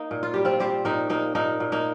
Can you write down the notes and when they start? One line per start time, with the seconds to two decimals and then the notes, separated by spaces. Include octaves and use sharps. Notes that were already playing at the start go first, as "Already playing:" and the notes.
Already playing: A#3 D#4
0.11 A#2
0.23 F4
0.34 G3 G4
0.45 C4 F4
0.60 G3 G4 C5
0.85 A#2 A#3 D#4
1.10 A#2 A#3 D#4
1.35 A#2 A#3 D#4
1.60 A#2
1.72 A#3 D#4